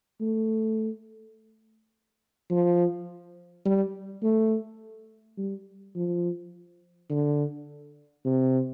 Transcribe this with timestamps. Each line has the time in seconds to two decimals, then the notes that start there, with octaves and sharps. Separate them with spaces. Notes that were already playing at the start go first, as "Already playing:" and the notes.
0.21 A3
2.51 F3
3.65 G3
4.23 A3
5.37 G3
5.95 F3
7.10 D3
8.25 C3